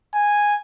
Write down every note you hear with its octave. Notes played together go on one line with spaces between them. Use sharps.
G#5